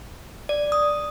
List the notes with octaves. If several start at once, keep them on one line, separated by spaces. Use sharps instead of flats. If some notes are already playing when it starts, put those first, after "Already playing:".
D5
D#6